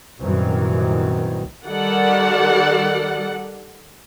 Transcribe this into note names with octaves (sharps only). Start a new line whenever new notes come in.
C2 F#2 A#2 D#3 E3 F#3
D#3 G3 A4 D5 F#5